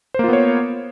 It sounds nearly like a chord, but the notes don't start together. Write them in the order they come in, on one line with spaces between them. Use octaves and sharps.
C5 A#3 F4 B3 C#5